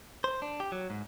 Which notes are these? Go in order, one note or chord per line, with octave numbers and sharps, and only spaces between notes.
C5
D4
G4
F#3
G#2